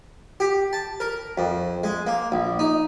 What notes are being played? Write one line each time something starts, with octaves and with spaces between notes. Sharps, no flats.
G4
A5
A#4
F2
G#3
A#3
A#1
D#4